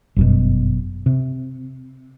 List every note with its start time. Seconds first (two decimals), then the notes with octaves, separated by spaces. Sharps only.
0.16 G1 F#2 B2
1.06 C3